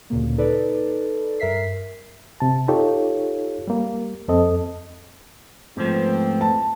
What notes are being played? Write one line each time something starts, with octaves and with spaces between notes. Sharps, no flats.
D2 A#2 C#3 A#3
D#4 A4 B4 D5
G2 A#4 E5 B6 C7
C3 A5
D#4 F4 G4 A4 C#5
G3 A#3
F2 C4 A4 D#5
G#2 F3 A3 B3 C4
A5